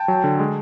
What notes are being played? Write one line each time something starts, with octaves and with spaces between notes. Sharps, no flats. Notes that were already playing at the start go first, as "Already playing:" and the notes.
Already playing: G5 A5
F#3
D3
G#3